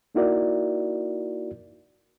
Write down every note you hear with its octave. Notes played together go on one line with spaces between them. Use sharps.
A#3 D#4 E4 F#4 A#4 D5